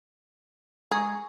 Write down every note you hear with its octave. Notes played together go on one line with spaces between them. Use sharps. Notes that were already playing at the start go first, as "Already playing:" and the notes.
G#3 G#4 A#5 C#6